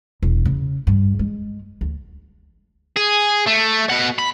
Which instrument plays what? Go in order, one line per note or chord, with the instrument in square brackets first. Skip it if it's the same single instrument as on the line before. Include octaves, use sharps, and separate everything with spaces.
[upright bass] E1
C#3
G2
G#3
D2
[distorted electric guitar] G#4
A3
B2 F#5
B5